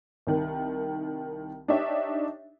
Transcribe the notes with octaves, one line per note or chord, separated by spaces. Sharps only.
C2 D#3
D4 D#4 G4 C#5 E5